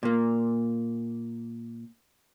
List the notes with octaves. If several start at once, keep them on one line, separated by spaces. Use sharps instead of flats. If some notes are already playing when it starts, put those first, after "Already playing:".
A#2 A#3